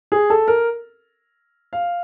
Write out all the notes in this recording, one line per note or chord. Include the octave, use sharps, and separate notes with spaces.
G#4
A4
A#4
F5